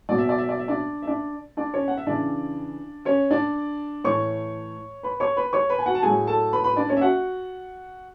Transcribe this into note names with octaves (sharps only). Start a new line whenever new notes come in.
B2 F#3 D5
E5
D5
E5
D5
E5
D4 D5
E5
D4 D5
D4 D5
C#4 C#5
F#5
E5
C#3 E3 D4 D5
C#4 C#5
D4 D5
A2 E3 C#5 C#6
B4 B5
C#5 C#6
B4 B5
C#5 C#6
B4 B5
G#5
F#4 F#5
A5
A2 F#3 G#4 G#5
A4 A5
B4 B5
B4 B5
D4 D5
C#4 C#5
E5
F#4 F#5